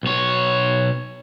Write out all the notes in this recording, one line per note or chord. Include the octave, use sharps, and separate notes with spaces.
B1 C#5